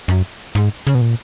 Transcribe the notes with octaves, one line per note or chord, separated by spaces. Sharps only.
F#2
G#2
C#3
B2
A#2